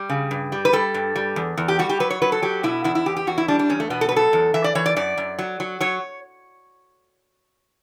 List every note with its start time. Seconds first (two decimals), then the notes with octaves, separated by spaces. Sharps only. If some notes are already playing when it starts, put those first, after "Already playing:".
Already playing: G3 G4
0.10 C#3
0.31 G2
0.52 G3
0.65 B4
0.73 G3 A4
0.94 G2
1.16 G3
1.36 E2
1.57 E2
1.68 G4
1.79 G3 F#4
1.89 G4
2.00 F#3 B4
2.10 C#5
2.22 F#3 B4
2.32 A4
2.42 F#3 G4
2.63 B2 E4
2.84 E2 E4
2.95 E4
3.06 E2 G4
3.16 G4
3.27 E2 F#4
3.38 E4
3.48 G3 D4
3.59 D4
3.69 E2 C#4
3.80 A3
3.90 B2 B3
4.01 A4
4.09 B4
4.12 F#3 A4
4.33 E2
4.54 E3 E5
4.64 D5
4.75 E3 C#5
4.86 D5
4.96 F#2 D5
5.17 F#2
5.39 F#3
5.60 F#3
5.80 F#3 C#5